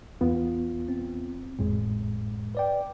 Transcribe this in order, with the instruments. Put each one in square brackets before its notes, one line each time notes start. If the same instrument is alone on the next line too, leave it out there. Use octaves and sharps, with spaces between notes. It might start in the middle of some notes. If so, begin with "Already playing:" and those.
[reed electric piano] E2 B3 F4
[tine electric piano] C4
[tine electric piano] G#1 F2 [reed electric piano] A2 G#3
[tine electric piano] B4 D5 G5